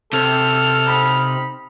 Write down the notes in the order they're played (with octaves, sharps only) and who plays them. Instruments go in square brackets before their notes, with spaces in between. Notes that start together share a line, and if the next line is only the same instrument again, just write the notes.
[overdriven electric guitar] C3 [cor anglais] A4 [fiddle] F6
[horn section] C4 D#4 B5